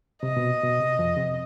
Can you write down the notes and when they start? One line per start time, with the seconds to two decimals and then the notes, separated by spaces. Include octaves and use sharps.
0.23 C3 D#5
0.37 B2
0.63 B2
0.80 C3
0.99 F2 F3
1.17 C3 C4